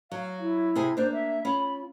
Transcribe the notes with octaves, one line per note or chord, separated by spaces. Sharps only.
F#3 F5
E4
C3 G4 G#4
A#3 D4 C5
E5
C#4 F4 B5